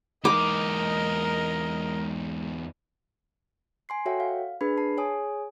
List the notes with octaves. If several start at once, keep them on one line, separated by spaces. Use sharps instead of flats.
E2 G#3 D#4 A#4 D#5 D6
G#5 C6 C7
F#4 A4 C#5 E5 F#5 G5
F5
D4 G#4 B4 B5
A5 C7
G#4 C#5 G#5 D#6